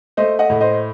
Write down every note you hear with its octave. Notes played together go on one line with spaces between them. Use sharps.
A3 C5 D#5
D#5 F#5
A2
C5 D#5